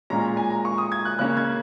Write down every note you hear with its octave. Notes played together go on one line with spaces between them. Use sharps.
A#2 G#3 C#4 A#5
G#5
A#5
C#6
D#6
G#6
F#6
C#3 A#3 C#4 F#6
G#6